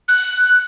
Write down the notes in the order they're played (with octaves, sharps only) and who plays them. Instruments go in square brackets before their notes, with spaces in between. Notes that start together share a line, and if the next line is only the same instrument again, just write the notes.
[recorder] F#6